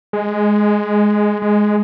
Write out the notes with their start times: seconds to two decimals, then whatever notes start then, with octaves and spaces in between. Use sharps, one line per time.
0.13 G#3
1.42 G#3